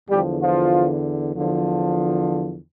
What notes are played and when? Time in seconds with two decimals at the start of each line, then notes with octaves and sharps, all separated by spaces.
0.10 E2 D3 F3 G3 G4
0.42 F3 F4
1.35 E2 D3 F3